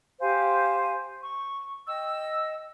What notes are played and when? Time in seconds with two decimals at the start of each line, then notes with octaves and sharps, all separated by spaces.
0.20 G4 C5 F5 G#5
1.22 C#6
1.88 D#5 G5 E6